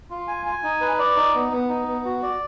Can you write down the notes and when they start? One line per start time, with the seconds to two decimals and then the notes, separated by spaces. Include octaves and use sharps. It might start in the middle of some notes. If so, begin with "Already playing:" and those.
0.10 F4
0.28 G#5
0.46 G#5
0.63 D#4
0.81 B4
0.99 D5
1.17 D#4
1.34 B3
1.52 B3
1.70 D#4
1.88 B3
2.05 F#4
2.22 D5